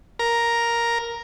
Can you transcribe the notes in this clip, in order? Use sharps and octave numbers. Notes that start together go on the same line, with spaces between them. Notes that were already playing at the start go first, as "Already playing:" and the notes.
A#4